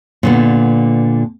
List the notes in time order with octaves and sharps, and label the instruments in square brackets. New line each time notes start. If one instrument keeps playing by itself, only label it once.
[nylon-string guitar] A#2 D3 B3